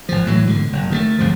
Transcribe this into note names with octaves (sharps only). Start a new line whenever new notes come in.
G#1 F3
A2 E3 F#3
G#2 B2 D3
F#1
D#3 G3 A3
G1 F2 G#2 F3